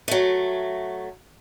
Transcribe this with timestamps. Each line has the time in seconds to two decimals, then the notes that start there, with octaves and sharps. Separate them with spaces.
0.08 F#3 A3